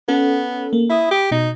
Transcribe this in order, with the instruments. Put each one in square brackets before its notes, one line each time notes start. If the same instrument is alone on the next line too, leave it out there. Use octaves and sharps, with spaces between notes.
[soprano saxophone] B3 [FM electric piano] C#4 A4
[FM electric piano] A#3
[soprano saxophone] E4 [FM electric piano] B5 D#6
[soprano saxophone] G4
[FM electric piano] B2 [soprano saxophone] D#4